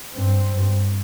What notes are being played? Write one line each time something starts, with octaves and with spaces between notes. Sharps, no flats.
G2 C4
G2